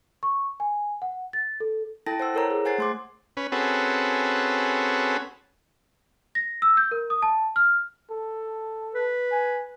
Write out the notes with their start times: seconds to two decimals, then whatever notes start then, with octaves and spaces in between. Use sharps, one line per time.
0.23 C#6
0.60 G#5
1.02 F#5
1.33 A6
1.60 A4
2.07 E4 A4 G5 A5 A6 A#6
2.19 C5 F#5 E6
2.34 E4 A4 A#4 C#5 A#5
2.51 G#4
2.65 C5 F#5 G#5 G#6 A6 C7
2.78 A3 C6 D6
3.37 C#4 B4
3.52 C4 C#4 F#4 G#4 A4 B4
6.35 A#6
6.62 E6
6.77 G6
6.91 A#4
7.10 D#6
7.22 A5
7.56 F6
8.11 A4
8.95 B4
9.32 G#5